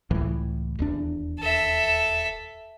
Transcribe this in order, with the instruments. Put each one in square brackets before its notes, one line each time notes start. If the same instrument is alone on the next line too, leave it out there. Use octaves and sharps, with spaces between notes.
[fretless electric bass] C#2 A2 E3
D#1 E2 D4
[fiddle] A4 E5